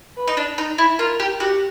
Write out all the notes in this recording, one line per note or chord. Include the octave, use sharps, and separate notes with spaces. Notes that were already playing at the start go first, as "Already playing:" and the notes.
B4
D#4
D4
D#4
E4
F4 A#4
G4
F#4 G4